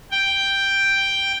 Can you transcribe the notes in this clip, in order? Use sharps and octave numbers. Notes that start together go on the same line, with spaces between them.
G5